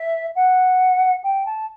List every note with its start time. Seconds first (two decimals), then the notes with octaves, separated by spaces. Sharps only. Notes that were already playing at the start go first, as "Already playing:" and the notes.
Already playing: E5
0.35 F#5
1.23 G5
1.45 A5